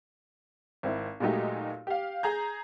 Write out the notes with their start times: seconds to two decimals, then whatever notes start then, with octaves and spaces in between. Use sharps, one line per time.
0.83 G#1 C4 E4
1.20 A#2 F#3 G#3 A3 D#4 G4
1.87 G4 F5
2.23 G#4 A#5 G6